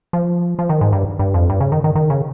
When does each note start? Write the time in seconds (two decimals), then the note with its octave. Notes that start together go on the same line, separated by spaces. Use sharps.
0.13 F3
0.59 F3
0.69 D#3
0.81 G#2
0.92 G2
1.19 G2
1.34 F2
1.50 G2
1.61 C#3
1.72 D#3
1.84 D#3
1.95 D#3
2.10 C#3